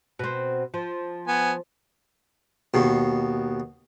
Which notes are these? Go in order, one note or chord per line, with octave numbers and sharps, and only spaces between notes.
B2 C4
F3
B3 G#5
D#2 B2